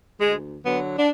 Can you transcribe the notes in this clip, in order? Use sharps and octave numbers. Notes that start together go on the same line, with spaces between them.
D2 G#3
D3 F#3 B3
D4